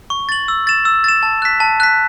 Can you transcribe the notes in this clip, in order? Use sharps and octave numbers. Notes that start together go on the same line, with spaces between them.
C#6
A6 F#7
E6
A6 E7
E6
A6 E7
A5
F#6 B6
A5
F#6 B6